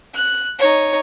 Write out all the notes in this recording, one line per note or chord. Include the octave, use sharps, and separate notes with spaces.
F#6
D#4 C#5